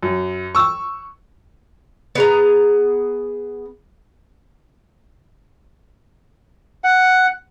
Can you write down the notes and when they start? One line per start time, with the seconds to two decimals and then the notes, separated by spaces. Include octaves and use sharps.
0.03 F#2
0.55 C#6 E6
2.15 B3 G#4 A#5
6.84 F#5